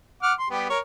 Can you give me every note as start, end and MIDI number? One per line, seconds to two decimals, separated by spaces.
0.23 0.33 78
0.23 0.33 86
0.23 0.33 89
0.39 0.48 84
0.50 0.68 55
0.50 0.68 59
0.50 0.68 67
0.70 0.79 70
0.70 0.79 73